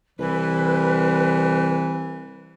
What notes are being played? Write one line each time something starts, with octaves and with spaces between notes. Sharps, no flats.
C2 E3 B4